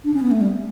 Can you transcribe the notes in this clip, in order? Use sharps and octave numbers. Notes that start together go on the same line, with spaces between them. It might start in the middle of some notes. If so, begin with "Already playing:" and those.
D4
C#4
B3
A3
G3